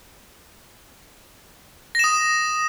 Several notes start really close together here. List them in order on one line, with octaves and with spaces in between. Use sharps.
A#6 E7 D#6